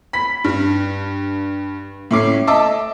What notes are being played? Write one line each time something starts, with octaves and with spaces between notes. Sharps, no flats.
B5 B6
G2
A2 C#4 D6 C7
D#5 E5 A5 D6 E6